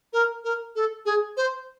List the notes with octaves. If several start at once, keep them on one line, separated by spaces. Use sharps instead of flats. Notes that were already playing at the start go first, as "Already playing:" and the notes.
A#4
A#4
A4
G#4
C5